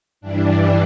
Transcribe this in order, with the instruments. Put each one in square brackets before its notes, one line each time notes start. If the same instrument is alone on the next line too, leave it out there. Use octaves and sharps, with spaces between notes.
[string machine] G2 E3 G3 D4